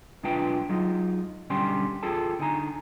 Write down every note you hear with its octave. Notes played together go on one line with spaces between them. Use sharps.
B1 G#3 D4 F4 B4 G5
F#3 G#3 D#4 F4
B1 D3 G3 C#4 G5 C6
E2 F4 G#4 A4 G5 A5
D3 D#4 G#5 A#5